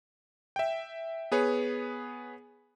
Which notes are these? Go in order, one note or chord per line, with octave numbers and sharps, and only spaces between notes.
E5 G5
B3 G#4 B4 C#5